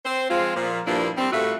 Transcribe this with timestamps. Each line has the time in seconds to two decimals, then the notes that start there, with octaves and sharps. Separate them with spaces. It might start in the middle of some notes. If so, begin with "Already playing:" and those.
0.05 C4 C5
0.29 F3 G#3 C4 F4
0.55 A#2 F3
0.86 G2 A#2 F3 A#3 D4 E4
1.18 G3 C4
1.32 A2 G3 A3 F4 F#4 E5